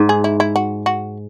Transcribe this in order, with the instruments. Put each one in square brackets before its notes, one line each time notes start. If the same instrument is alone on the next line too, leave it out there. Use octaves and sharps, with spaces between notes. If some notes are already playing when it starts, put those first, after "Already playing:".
Already playing: [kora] G#2
[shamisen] G#4
E4
E4
F#4
F#4